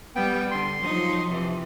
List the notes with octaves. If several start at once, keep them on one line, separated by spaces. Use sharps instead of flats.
G3 B3 G5
D3 C6
F3 F#3 D#4
C3 E3